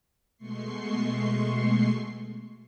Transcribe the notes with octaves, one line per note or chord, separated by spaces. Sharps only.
B2 G#3 A3 C6 C#6 C7